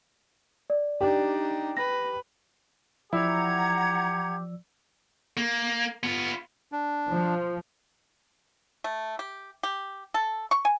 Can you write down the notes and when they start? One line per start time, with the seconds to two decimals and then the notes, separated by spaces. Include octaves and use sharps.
0.70 D5
1.01 D4 D#4 G4
1.77 B4 A#6
3.13 F3 E4 G4 D5 F#5 A#5 E6 G#6
5.37 A#3
6.03 B3 F4
6.72 D4
7.08 F3
8.84 A3
9.19 G4
9.63 G4
10.14 A4
10.51 C#6
10.65 G#5